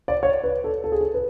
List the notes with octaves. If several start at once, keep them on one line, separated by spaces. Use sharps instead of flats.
D5
C#5
B4
A4
A4
G#4
A4
B4